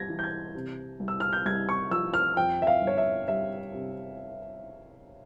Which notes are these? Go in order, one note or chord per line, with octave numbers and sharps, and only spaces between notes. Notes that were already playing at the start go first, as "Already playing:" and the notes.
Already playing: G3 G#6 A#6
E3
G6
G#6
C3
C2
E6
F6
G6
C2 G#6
C#6
F3 E6
F6
F2 G5
E5
F5
G1
C#5
E5
G3 E5
C3